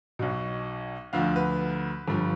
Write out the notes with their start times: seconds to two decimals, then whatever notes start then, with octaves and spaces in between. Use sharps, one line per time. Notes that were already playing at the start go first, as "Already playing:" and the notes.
0.19 B1 B2
1.13 D2 D3 F3 F5
1.36 B4
2.08 G1 G2 F3